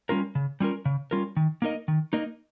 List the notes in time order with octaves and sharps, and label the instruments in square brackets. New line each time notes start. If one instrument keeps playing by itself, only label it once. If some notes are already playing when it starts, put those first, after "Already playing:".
[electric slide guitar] G3 C#4 F4 A#4
C#3
G3 C#4 F4 A#4
C#3
G3 C#4 F4 A#4
D#3
A#3 D#4 A#4 D#5
D#3
A#3 D#4 A#4 D#5